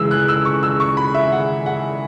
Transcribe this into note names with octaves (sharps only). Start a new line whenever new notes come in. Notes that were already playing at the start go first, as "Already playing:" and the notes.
Already playing: C#3 E3 G#3 E6
F#6
E6
C#6
E6
C#6
B5
E5
F#5
F#5